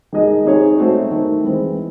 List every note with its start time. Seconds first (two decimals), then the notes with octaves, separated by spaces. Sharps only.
0.13 D#3 G#3 D#4 G#4 D#5
0.45 C4 D#4 G#4 C#5
0.78 A3 C4 F#4
1.11 D#3 A3 C4
1.44 E3 G#3 C4